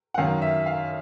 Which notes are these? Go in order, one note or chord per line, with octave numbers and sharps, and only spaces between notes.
F#5
F#2 D#3 F5
E5
F5